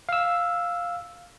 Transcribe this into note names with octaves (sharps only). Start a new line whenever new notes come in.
F5 E6